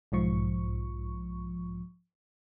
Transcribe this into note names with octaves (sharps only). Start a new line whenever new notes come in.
B1 G#2 F3 C#6